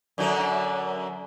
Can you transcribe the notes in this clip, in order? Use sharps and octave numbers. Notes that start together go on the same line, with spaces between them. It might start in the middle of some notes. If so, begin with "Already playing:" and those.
F#2 D3 F#3